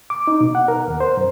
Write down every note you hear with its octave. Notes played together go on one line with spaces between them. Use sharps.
D6
D#4
B2
F#5
A#4
D#2
C5
F#2